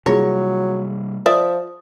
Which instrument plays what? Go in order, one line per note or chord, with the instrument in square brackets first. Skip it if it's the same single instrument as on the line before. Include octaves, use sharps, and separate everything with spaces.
[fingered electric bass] C3 G3 A#3 [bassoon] F#3 [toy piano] E4 F4 G#4 [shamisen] C#5
[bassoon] F3 [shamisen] D5 E5 [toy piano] D#6